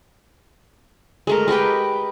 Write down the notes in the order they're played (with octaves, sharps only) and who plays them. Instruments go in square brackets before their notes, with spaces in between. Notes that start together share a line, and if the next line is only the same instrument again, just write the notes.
[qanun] G#3 A3 A#4
G#3 G4 B4 G5